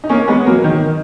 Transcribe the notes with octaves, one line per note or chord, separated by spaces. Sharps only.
D#4
A#3 C#4
G#3 B3
F#3 A#3
D#3